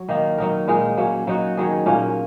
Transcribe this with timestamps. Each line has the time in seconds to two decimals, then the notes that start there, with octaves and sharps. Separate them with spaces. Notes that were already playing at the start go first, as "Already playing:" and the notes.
Already playing: F#3
0.09 D#3 A#3 D#4
0.38 F#3 D#4 A#4
0.68 A#2 G#3 D#4 A#4
0.97 F#3 A#3 C#4
1.27 F#3 D#4 F#4
1.57 D#3 F#3 C#4 G#4
1.86 A#2 A#3 C#4 A#4